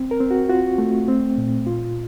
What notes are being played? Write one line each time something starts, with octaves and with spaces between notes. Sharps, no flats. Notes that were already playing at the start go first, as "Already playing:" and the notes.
Already playing: C4
A#4
C4
F#4
F4 F#4
A3
C4
A#2
F4